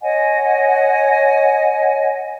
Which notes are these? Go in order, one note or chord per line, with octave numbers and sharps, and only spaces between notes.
C#5 D#5 F#5 G#5